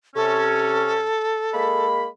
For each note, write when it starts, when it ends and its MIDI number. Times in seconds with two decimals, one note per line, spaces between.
0.15 1.02 48
0.15 1.02 61
0.15 1.87 69
1.53 2.06 56
1.53 2.06 58
1.53 2.06 83